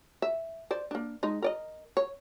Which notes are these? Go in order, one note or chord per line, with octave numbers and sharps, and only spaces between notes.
E5
C5 D5
A#3 D4
G#3 D#4
A#4 D5 D#5
C#5